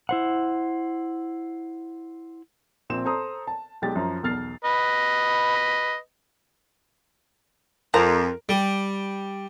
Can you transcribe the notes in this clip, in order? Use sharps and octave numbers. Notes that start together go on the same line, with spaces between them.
E4 C5 F#5
A#1 A#2 C4 E7
A4 C5 A#5 C6 D#6
A5
B1 G#3 G4 A6
F#2 F3 A#5
B1 E2 F6 A6 C7
B4 D#5
F2 F3 A#4 A#5
G3